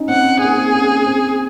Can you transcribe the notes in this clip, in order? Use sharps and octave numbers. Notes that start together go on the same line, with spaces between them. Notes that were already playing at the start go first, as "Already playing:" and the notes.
Already playing: C#4 D#4
C4 F#5
A#3 G#4
C4
C#4
C4